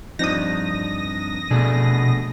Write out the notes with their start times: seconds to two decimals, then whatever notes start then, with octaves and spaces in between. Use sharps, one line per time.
0.19 G2 F3 C4 D4 D#4 D#6 A#6
1.51 B2 A3 D4 G#4